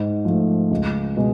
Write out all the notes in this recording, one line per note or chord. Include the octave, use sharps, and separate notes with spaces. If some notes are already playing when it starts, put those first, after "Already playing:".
Already playing: G#2
F3 A3
C#2
B2 G#3